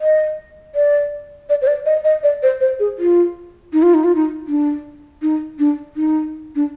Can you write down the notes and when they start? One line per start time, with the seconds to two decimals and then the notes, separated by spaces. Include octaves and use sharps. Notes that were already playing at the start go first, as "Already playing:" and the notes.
0.01 D#5
0.75 D5
1.49 D5
1.62 C5
1.67 D5
1.86 D#5
2.04 D#5
2.23 D5
2.43 C5
2.61 C5
2.80 G#4
2.98 F4
3.73 D#4
3.82 F4
3.94 D#4
4.04 F4
4.15 D#4
4.48 D4
5.22 D#4
5.59 D4
5.96 D#4
6.56 D4